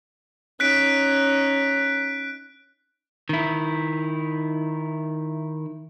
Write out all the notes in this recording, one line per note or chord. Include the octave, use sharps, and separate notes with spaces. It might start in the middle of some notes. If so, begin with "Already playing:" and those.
C#4 D#4 F#6 B6 D7
D#3 E4